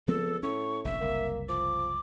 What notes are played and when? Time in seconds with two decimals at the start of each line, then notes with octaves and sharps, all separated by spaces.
0.08 C#2 F3 B3 C4 A4
0.43 A2 C#4 C#6
0.85 F1 A#1 D#2 E5
1.01 F#1 C2 A#3
1.49 F3 D6